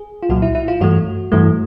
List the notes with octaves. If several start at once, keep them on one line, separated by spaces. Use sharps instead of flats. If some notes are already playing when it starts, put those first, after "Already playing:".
Already playing: G#4
F4
C2 A#2 F#3 F#4
E4
E4
F4
G2 E3 A3 F#4
G2 E3 A3